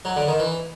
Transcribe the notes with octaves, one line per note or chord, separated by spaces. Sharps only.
F#3
D3
D#3
E3